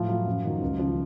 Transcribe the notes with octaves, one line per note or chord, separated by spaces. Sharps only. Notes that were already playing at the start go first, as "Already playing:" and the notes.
Already playing: A2 F3 F4
F#3
F#2
D#3 F#3
C#2
C#3 F3